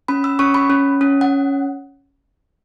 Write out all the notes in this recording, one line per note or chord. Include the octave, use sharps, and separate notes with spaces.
C#4 B5
E6
C#4 C#6
B5
C#4
C#4
F#5